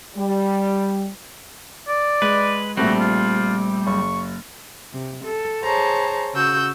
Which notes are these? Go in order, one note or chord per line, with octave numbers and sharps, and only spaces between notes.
G3
D5
G#3 B4
A#1 G3 A3 C4 F#4
F4
F#1 C#6
C3
A4
G#4 C5 C#5 A5 A#5
C#3 F#4 E6 G6